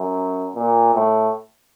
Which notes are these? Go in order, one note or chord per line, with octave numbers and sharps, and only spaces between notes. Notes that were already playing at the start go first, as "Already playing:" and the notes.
Already playing: F#2
A#2
A2